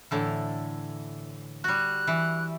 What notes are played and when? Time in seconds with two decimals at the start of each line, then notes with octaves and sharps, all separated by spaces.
0.11 A2 D3 E3
1.64 G3 F#4 F#6
2.07 E3